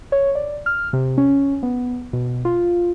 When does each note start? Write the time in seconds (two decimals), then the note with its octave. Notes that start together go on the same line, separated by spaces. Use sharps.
0.12 C#5
0.35 D5
0.66 F6
0.93 C3
1.18 C#4
1.63 B3
2.13 B2
2.45 F4